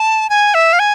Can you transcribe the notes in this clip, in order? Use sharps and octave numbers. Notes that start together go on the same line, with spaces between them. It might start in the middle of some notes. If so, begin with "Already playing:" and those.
Already playing: A5
G#5
E5
F5
G#5